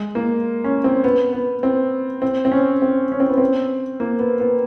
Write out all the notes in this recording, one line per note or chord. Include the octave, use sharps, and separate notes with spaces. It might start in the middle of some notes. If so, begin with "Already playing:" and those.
Already playing: G#3
A#3
C#4
C4
B3
B3
C4
C4
C4
C#4
C4
C#4
C4
B3
C4
A#3
B3
B3